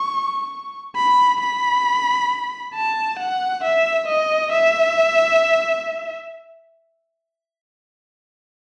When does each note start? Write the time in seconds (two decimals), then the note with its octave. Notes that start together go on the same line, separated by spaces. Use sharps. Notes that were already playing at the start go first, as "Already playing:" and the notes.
Already playing: C#6
0.96 B5
1.40 B5
2.74 A5
3.19 F#5
3.64 E5
4.08 D#5
4.52 E5